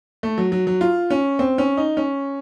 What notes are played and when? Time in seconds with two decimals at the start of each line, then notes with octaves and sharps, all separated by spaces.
0.23 A3
0.38 F#3
0.52 F#3
0.67 F#3
0.81 F4
1.10 C#4
1.39 C4
1.58 C#4
1.77 D#4
1.97 C#4